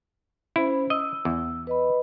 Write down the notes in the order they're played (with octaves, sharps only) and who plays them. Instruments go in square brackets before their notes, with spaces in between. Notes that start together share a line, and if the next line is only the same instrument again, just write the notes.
[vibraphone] C#4 C5 B5 [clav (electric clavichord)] E4
[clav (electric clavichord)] D#5 [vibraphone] E6
[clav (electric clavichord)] E2
[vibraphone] B4 D#5 B5